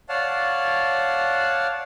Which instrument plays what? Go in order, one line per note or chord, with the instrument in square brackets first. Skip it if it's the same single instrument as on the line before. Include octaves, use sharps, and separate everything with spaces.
[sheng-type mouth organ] C#5 D5 F5 F#5 A5